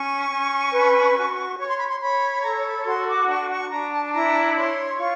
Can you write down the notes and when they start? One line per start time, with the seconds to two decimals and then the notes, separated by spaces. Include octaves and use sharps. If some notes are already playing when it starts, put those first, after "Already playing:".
Already playing: C#4 C#6
0.30 C#4
0.72 B4
1.15 F#4
1.57 C#5 C#6
1.68 C6
1.78 B5
1.88 C6
1.99 C#5 B5
2.42 A4 A#5
2.64 B5
2.85 F#4 C6
3.06 D6
3.27 D4 C#6
3.49 C#6
3.70 D4 A#5
3.91 A5
4.05 A5
4.12 E4 A#5
4.55 C#5 C6
4.98 F4 C#6